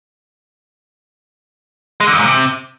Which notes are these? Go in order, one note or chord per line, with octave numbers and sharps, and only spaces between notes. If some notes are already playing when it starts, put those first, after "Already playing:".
G#3
D3
F2
G#2
C3